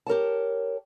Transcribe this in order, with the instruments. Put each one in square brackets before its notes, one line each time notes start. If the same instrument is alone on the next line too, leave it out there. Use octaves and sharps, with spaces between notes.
[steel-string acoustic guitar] G4 A#4 C#5 A5